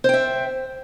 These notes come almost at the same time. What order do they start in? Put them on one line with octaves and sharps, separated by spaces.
C5 G5 E5